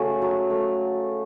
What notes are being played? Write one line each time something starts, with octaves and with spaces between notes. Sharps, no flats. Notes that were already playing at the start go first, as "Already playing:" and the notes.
Already playing: C#3 A3 F#4
F#3
A3